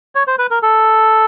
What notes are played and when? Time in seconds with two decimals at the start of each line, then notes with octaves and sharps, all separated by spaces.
0.15 C#5
0.27 C5
0.38 B4
0.51 A#4
0.62 A4